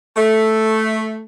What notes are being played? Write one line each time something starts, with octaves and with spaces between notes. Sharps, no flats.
A3